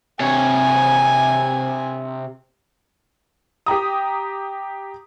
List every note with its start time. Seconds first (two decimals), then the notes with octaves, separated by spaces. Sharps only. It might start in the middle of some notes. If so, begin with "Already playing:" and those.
0.21 C3 C#5 G#5
3.66 G4 G5 A#5 D#6